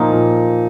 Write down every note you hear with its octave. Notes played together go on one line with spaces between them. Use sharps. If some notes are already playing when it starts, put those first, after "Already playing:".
Already playing: A#2 F3 A#3 D#4 F4
A#2